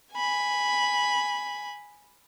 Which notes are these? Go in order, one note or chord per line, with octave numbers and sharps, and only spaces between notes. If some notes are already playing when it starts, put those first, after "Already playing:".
G#5 B5